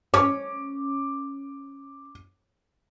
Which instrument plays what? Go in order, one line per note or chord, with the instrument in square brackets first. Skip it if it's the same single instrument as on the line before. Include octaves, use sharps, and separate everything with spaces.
[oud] C#4 [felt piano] D6